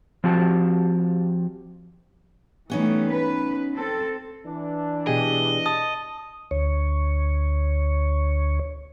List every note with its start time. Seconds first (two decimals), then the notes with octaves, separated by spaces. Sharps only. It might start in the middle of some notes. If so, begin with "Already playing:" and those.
0.24 F3 C4 F#4 G4 A5
2.70 E3 G3 A3 B3 C#4 D#4
3.09 B4
3.74 C4 A4
4.45 E3 D4
5.07 B2 G4 G#4 D#5
5.66 A5 D#6
6.51 D2 C#5